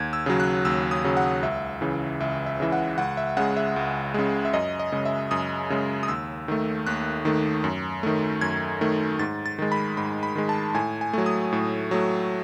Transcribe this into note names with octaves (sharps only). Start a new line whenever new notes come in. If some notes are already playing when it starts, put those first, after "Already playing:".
Already playing: D#2 G#6
E6
C#3 F#3
F#6
D#2 E6
D#6
C#3 F#3
F#5
C#2 E5
C#3 E3
C#2 E5
E5
C#3 E3 E5
F#5
C#2 F#5
E5
C#3 G#3 F#5
E5
C#2
C#3 G#3
E5
F#2 D#5
D#5
C#3 G#3
E5
F#2 D#6
C#3 G#3
D#6
D#2 E6
D#3 A3
D#2 F#6
D#3 A3
F#2
D#3 A3
F#2 G#6
D#3 A3
G#2 A6
A6
D#3 G#3
B5
G#2 B5
B5
D#3 G#3
A5
A2 G#5
G#5
F#3 A3
D#6
A2
F#3 A3